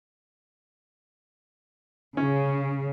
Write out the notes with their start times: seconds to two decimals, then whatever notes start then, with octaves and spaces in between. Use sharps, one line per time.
2.17 C#3 C#4